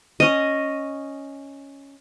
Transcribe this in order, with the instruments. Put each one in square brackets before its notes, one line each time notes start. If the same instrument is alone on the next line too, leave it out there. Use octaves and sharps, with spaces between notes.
[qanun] C#4 D#5